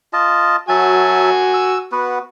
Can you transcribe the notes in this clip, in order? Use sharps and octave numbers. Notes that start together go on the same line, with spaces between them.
F4 D#5 A5
F#3 F#4 E5 G#5 A5
E6
B3 F#4 B4